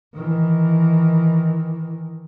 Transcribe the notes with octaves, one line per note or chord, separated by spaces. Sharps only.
D#3 E3